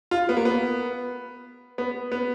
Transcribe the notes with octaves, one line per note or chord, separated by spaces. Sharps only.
F4
B3
A#3
B3
B3
B3